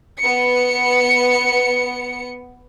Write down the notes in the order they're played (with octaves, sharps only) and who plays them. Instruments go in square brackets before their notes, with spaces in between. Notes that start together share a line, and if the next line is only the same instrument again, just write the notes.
[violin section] B3 C#7